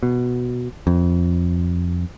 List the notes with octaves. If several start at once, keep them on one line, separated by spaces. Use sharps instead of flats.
B2
F2